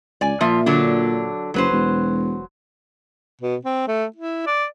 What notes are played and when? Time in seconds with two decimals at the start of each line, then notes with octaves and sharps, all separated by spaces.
0.21 C#2 D5 G#5
0.41 A#2 F3 F4 E5
0.66 D3 F#3 D4
1.54 F#1 F#3 B4 C5
1.72 E1
3.41 B2
3.65 C4
3.88 A3
4.16 E4
4.46 D5